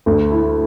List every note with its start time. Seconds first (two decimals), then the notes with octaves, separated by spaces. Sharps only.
0.06 D2
0.31 E4